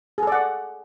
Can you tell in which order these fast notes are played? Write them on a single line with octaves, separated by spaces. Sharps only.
G#4 A4 D5 F#5